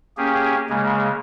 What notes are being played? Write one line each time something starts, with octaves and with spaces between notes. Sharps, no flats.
A#3 C#4 G4 G#4
C#3 G#3 A#3